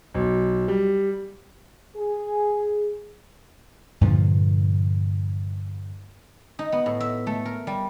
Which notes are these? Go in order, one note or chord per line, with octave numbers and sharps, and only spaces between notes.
B1
G3
G#4
G2 A#2 D3 F3
D#4
B3
A2
E5
A3
A#4
G3